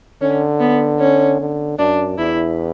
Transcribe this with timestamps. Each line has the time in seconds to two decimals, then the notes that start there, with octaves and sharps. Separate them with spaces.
0.21 D3 C#4
0.60 B3
1.00 C#4
1.40 D3
1.79 F#2 D4
2.18 E2 E4